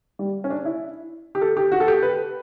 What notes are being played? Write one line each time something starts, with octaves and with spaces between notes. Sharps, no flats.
G3
C#4
D4
E4
G4
A4
G4
F#4
A4
G4
B4